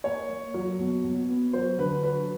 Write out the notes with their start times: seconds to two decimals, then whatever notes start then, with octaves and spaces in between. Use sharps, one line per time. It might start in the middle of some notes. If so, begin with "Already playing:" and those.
0.04 A#3 C#5
0.29 A#3
0.54 F#3
0.79 B2
1.04 B2
1.29 B3
1.53 F#3 C5
1.79 D3 B4
2.03 F#3 B4